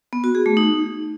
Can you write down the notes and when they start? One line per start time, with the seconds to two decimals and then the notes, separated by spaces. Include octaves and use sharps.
0.13 B3
0.24 F#4
0.35 G#4
0.46 A3
0.57 D#4